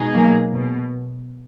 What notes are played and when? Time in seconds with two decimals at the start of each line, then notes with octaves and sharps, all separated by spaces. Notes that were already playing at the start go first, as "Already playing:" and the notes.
Already playing: B2 G#3 D#4 G#4
0.13 F#3 A#3
0.54 B2